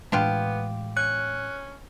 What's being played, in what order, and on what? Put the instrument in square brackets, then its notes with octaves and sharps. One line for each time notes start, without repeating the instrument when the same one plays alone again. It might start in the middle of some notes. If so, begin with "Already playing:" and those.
[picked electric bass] A2 E3 G#3 [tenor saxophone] B3 [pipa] D4 F4 G4
[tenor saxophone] C#4 [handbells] F#6